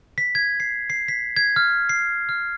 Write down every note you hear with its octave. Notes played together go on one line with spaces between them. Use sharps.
B6
G#6
C7
C7
B6
G#6
F6
C7
F6